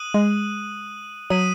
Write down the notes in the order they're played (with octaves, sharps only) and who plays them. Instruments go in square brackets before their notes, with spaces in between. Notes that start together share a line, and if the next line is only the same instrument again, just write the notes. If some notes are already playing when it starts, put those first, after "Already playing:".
Already playing: [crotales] D#6 F#6 D#7 F#7
[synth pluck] G#3
[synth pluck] F#3 [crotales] D#6 B6 D#7 F#7